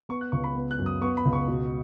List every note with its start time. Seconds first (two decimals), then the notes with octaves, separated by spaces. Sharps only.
0.09 B3 C#6
0.21 F#6
0.32 C#2 C#6
0.44 B5
0.55 B3
0.71 F#6
0.78 F#2
0.86 D#6
1.01 B3 C#6
1.17 B5
1.25 C#2
1.33 C#6
1.47 B2